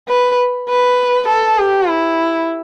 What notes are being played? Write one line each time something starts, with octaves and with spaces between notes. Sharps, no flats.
B4
B4
A4
G4
E4